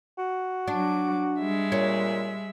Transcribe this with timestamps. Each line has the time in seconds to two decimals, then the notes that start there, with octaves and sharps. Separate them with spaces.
0.18 F#4
0.68 F#3 D4 D6
1.39 G3 G#3 E5
1.72 A#2 C#5